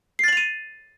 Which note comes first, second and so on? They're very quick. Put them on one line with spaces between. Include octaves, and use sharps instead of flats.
C7 A6 F#7 F7 D#7